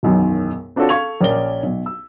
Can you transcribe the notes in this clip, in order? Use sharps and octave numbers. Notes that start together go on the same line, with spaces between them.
E1 B1 F#2 D#3
C4 D4 F4 F#4 A4 C#5
A4 F5 C#6 G#6 F7
A#1 C#4 A#4 D5 G7
B1
E6